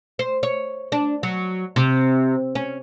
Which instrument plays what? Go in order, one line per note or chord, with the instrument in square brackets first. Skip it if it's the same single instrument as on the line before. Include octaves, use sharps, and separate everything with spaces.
[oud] C5
C#5
D4
F#3
C3
C#4